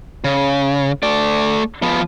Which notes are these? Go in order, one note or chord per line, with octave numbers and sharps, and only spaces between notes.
C#3
A3 D5
F3 B3